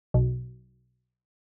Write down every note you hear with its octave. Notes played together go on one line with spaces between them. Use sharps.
B1